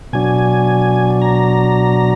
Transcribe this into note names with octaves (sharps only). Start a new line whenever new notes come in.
B2 F#3 D4 G#5
A#5